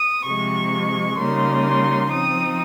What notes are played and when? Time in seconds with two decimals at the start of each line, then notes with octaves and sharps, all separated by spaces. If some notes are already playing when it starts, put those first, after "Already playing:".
Already playing: D#6
0.24 C3 F3 G#3 C#6
1.18 C#3 G3 A#3 D#4 C6
1.65 C6
2.11 F3 C4 D#4 D#6